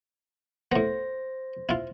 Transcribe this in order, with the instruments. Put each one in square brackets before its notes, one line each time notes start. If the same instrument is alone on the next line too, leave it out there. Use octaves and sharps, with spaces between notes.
[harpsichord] A2 B3 [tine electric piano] C5 A#6
[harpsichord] E4 F4